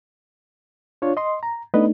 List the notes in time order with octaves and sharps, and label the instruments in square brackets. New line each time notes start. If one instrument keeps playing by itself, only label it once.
[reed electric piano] D4 F4 C#5
D#5 C6
A#5
[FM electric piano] A3 D4 D#4 [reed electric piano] B3 B4 D#5